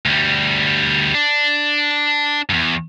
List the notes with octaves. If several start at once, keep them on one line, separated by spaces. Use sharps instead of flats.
D2 G3
D4
E2 G2